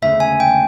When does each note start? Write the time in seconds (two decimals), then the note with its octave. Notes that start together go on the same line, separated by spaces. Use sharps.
0.02 E1 D2 C#3 E5
0.20 G#5
0.40 G5